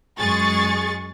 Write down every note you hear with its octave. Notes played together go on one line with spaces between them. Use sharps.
F#2 G#3 G#4 C#6 A6